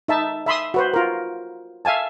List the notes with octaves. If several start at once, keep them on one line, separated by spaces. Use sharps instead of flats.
D#4 E5 A5
E5 B5 C6 D#6
F#4 B4 C5
F4 A#4
E5 F5 G#5 A5